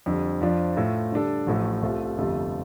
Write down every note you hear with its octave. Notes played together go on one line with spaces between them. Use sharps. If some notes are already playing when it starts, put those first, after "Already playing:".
F2 D3 G3
F2 F3 D4 F4 D5
A2 A3 F4
D3 G3 D4 A4
A1 A2 F3 A3
C2 C3 A3 F4
G1 F2 C3 A3 F4